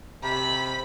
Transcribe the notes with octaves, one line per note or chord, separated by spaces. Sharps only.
C3 B5